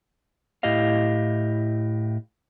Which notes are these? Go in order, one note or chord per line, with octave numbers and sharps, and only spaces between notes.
A2 E4 G4 D#5 F5